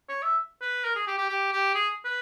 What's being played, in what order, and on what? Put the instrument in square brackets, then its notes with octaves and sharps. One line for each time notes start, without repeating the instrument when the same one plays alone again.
[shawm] C#5
E5
B4
A#4
G#4
G4
G4
G4
G4
G#4
B4